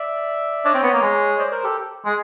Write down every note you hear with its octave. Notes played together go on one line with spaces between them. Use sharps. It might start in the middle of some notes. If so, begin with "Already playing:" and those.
Already playing: D5 E5
D4 C#5 D#5
C4
B3
A#3
G#3
C5 D5
A#4 C5
G4 A4
G#3